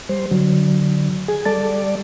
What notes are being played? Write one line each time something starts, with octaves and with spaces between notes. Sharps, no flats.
G3 C5
D3 F#3
G#4 G#5
G3 A4 D5 A5 A6